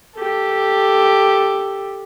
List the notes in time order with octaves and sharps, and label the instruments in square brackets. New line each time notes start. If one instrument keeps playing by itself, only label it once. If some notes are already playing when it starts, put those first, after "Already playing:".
[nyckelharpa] G4 A4